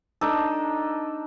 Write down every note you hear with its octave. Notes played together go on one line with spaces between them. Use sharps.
D4 D#4 A4